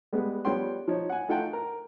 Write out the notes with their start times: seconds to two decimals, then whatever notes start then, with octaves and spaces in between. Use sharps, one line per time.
0.13 G3 G#3 B3
0.45 F3 G3 B3 C#5 G5 C6
0.88 F3 D#4 C#5
1.09 F#5 G#5
1.28 A3 D#4 F4 F#5 G5 A5
1.53 A#4